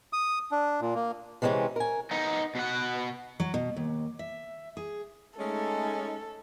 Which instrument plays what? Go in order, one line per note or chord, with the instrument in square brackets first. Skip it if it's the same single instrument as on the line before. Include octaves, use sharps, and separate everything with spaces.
[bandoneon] D#6
D4
A#2
A#3
[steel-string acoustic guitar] C3 E3 G#3 C4 C#4
A#4 G#5
[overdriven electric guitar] B3 D#4
B2 F#5
[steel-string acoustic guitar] F#3
B2
D#2
E5
G#4
[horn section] G#3 C#4 [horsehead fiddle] A3 D#4 [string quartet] A4